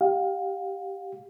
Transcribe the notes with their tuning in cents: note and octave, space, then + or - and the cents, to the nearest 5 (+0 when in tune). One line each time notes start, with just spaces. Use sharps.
G4 +0 F5 +30